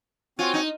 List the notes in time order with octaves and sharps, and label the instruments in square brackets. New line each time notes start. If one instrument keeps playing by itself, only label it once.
[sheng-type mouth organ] C4 F#4 C#5 G#5 [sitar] F4
[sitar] D#4